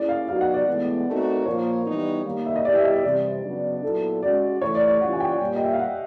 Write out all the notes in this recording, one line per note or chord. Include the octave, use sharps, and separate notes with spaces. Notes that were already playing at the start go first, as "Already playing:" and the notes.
Already playing: A#3 C#4 E4 G#4 D5
F5
F#3 B3 D#4 F#4 F5
F#5
D5
A2 E3 G#3 B3
A3 C4 D#4 F#4 A#4
A#2 F3 A#3 C#5
E3 G3 B3 D#4
D#3 G3 A#3
E5
D#5
G3 B3 E4 G4 D5
E5
D#5
D#5
C3 E3 G3 D5
C#3 F#3 B3 D4
A#2 F#3 B3 E4 A4
G#3 C#4 F#4 D5
A2 E3 A3 C#5
D5
D5
E3 G3 A#3 C#4 F4 F#5
G#5
G5
A#2 G3 A#3
D#5
E5
F5
F#5